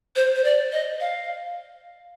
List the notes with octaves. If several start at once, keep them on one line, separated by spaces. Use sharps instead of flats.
C5
C5
D5
D#5
F5